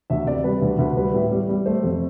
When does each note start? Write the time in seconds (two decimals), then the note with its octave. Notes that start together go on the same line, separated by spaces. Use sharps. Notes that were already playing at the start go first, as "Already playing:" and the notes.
0.10 D2 E5
0.26 C3 D5
0.44 G3 B4
0.62 D2
0.79 D2 B4
0.97 G3 B4
1.14 A2
1.31 G3
1.49 G3
1.66 A3 C5
1.84 F2